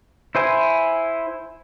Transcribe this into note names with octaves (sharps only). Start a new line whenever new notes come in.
E4 C5 G#5